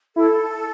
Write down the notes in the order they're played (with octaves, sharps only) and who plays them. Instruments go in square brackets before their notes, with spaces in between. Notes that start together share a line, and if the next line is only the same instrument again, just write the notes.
[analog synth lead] E4 [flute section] A4